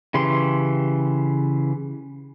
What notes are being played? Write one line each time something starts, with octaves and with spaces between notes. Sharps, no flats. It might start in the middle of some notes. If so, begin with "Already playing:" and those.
C#3 E3 G4 C6